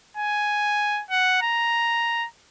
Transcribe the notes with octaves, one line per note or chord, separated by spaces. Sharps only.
G#5
F#5
A#5